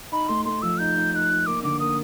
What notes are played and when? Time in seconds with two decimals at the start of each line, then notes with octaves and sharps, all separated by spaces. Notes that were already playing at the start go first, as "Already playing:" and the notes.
0.12 D#4 B5
0.29 A3 C6
0.45 A3 C6
0.62 F3 E6
0.79 D#4 G6
0.96 D#4
1.12 D#4 F#6 G6
1.30 D#4
1.46 A#3 D6
1.63 D3 D6
1.80 A#3 D#6